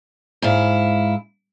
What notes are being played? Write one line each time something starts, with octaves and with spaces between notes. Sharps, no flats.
G#2 E4 F5